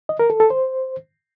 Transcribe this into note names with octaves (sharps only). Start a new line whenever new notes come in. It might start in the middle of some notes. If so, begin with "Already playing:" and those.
D#5
A#4
A4
A4
C5